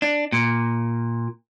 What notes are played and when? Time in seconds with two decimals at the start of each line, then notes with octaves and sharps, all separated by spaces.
0.02 D4
0.32 A#2